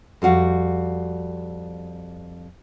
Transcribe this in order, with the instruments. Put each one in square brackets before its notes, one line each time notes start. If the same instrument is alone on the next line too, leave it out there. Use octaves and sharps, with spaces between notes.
[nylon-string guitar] F2 G3 F#4 F5